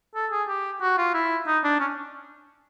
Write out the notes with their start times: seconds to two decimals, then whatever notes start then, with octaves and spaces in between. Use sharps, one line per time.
0.15 A4
0.31 G#4
0.48 G4
0.81 F#4
0.98 F4
1.14 E4
1.47 D#4
1.64 D4
1.80 C#4